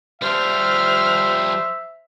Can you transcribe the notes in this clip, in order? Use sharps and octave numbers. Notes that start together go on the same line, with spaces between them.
F3 G3 C5 E5 F6